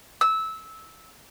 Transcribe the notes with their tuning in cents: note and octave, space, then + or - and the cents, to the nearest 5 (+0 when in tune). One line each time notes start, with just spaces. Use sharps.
E6 -15